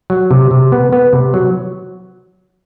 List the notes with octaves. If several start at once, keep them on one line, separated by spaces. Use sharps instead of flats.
F#3
C3
C3
B3
B3
C3
F#3